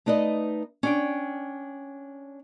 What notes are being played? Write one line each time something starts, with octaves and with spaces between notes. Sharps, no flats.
A3 D#4 B4 D5 D#5
C#4 D4 G5